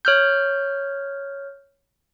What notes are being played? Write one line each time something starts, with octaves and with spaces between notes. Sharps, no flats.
C#5 F6 G6